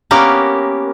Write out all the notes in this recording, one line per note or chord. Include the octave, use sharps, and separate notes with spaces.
A#3 B3 C#4 G4 A#4